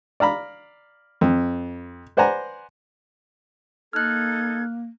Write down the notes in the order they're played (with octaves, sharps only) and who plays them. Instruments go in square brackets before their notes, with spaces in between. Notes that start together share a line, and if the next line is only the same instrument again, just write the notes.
[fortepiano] D5 F5 A#5 B5
F2
B4 C5 D5 F#5 G#5 A#5
[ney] A#3 [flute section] D#4 A4 G#6 [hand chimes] F6 F#6